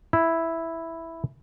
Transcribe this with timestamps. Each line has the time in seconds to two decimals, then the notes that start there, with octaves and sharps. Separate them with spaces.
0.13 E4